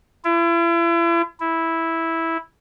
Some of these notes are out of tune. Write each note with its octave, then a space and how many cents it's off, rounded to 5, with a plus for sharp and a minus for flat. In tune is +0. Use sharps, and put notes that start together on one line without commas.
E4 +40
E4 -5